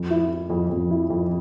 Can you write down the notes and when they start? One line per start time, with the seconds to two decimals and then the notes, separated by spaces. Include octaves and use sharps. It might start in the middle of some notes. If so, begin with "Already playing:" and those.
Already playing: F2
0.10 E4
0.31 E4
0.50 F2
0.70 F2
0.90 E4
1.10 F2